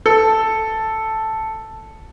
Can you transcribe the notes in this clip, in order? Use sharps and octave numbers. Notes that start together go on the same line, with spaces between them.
A4 A5